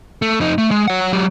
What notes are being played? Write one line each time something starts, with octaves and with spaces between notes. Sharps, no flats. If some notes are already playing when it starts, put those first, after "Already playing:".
A3
F2 D#4
A3
G#3
C#5 F#5
F#3 G4